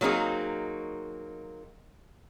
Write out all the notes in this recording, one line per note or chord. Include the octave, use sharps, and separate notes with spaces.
F#3 A#3 C4 D#4 G#4